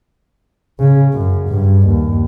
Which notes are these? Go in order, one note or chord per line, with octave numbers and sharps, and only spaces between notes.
C#3
F#2
G2
D#2